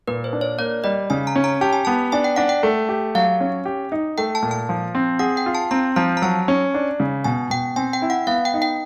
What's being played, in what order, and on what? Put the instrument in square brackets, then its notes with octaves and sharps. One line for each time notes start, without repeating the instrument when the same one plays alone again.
[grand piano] A#2 [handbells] B4
[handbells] C5
[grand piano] D4
[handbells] C#5
[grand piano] A#3 [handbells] D5
[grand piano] G3 [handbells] D#5
[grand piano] C#3 [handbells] G#5
[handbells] A#5
[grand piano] C#4
[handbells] A#5
[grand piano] G4 [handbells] A5
[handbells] G#5
[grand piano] B3 [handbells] A5
[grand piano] D4 [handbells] G#5
[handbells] G5
[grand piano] D4 [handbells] F#5
[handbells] G5
[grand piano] A3
G4
[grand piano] F#3 [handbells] F5
[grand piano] C#4
G4
D#4
[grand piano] A3 [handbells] G5
[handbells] A5
[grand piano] A#2
[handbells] A5
[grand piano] F3
C4
[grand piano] G#4 [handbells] F#5
[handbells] G5
[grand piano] F4
[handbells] A5
[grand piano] C4 [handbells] A#5
[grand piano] F3 [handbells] A#5
[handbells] A#5
[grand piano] F#3 [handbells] A5
[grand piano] C#4
D4
C#3
[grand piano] B2 [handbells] G#5
[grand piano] B2 [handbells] G5
[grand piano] C4 [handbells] G#5
[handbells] G5
[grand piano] E4
[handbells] F#5
[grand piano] B3 [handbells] F5
[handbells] G5
[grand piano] D#4
[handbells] G5